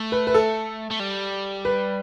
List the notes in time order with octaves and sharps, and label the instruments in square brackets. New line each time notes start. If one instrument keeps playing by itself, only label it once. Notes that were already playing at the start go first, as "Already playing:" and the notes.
Already playing: [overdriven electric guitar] A3
[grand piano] B4
B4
A4
[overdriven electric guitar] A3
G3
[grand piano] B4